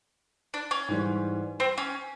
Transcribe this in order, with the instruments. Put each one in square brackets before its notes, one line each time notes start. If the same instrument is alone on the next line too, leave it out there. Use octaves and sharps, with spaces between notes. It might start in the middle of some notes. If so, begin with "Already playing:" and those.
[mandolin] D4
C#4
[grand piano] G#2 E3 G3
[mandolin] C4
C#4